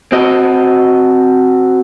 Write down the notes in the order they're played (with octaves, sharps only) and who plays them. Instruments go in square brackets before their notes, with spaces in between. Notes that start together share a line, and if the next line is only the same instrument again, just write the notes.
[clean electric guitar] C4 F#4 D#5